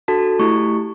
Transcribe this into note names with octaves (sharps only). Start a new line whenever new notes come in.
D4 F#4 A4 A5
A3 E4 G4 C#6